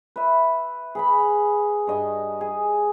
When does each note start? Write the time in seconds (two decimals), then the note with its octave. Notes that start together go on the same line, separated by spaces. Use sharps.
0.16 B4 E5
0.95 G#4 B4 B5
1.87 G2 D#5 G#5
2.41 G#4